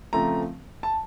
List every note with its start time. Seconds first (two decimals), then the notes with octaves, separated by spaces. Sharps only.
0.13 C#3 F3 A3 C4 A#5
0.83 A5